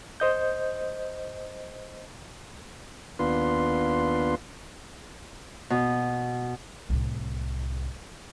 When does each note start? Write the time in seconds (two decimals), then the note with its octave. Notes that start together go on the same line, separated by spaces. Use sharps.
0.20 C5 D#5 G6
3.19 D#2 B3 D4 F4 B4 C6
5.70 B2
6.90 C2 A2